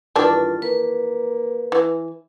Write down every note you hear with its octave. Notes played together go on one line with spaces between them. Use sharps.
G2 D#3 E3 D4 F4 A4
A#3 B4
E3